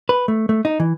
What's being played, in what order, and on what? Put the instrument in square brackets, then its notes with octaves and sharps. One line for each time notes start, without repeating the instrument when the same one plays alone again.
[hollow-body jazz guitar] B4
A3
A3
D#4
E3